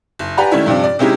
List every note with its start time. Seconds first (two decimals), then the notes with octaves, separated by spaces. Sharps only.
0.19 F#1
0.37 G4 B4 D5 F#5 G#5 A#5
0.51 D#3 A3 C#4 D4 E4
0.66 G2 C3 F3 D4
0.84 D5
0.99 C3 G#3 C#4 D#4 E4 G4